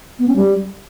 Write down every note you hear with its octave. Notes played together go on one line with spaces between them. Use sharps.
B3
C#4
G3